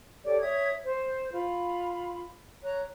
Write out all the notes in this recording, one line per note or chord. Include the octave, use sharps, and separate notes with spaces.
G4 A4 C#5 D5
C#5 E5 D#6 G#6
C5
F4 B5
C#5 A#5 F#6